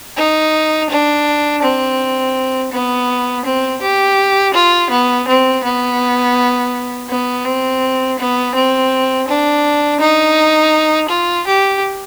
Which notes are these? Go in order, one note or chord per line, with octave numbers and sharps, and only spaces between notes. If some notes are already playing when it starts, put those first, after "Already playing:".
D#4
D4
C4
B3
C4
G4
F4
B3
C4
B3
B3
C4
B3
C4
D4
D#4
F4
G4